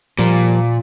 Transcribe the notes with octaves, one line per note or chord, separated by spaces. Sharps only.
A#2 F3 G3 A#3